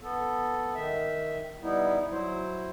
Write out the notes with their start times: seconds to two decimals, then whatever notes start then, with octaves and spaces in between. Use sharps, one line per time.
0.03 B3 A4
0.75 D#3 E5
1.62 G3 B3 D#4 E4
2.11 F#3 E4 C5